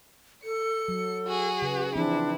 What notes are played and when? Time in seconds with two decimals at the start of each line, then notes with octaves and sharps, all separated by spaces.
0.44 A4 C#7
0.88 F#3
1.26 F#4 G#4
1.62 C#3 B4
1.95 E3 F3 C4 D4 E4